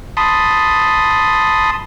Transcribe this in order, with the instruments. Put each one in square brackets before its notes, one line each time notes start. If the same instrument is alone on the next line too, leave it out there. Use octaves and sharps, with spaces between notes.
[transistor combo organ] A5 B5 C6 D#6